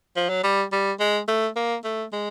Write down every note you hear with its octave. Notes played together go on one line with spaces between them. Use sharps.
F3
F#3
G3
G3
G#3
A3
A#3
A3
G#3